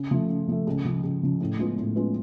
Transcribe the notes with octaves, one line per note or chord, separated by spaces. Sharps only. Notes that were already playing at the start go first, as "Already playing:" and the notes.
Already playing: C#3
F3 A3
C#3
F3 A3
C#2
C#3 F3
C#2
C#3 F3
A2
G#3 B3 F4 B4
A2
G#3 B3 F4 B4